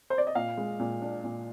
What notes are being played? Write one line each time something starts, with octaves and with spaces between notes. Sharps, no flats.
C5
D5
D#5
A#2 F5
G#3
A#2
D4
A#2